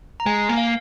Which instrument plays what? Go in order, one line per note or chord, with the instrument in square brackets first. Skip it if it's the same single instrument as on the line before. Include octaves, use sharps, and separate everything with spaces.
[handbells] A#5
[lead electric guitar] G#3 [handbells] G#5
[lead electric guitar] A#3
[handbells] F5